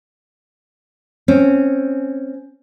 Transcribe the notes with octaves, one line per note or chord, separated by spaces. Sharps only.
C4 C#4